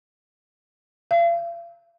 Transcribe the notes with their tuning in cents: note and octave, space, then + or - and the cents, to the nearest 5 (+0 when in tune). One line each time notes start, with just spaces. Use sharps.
F5 -40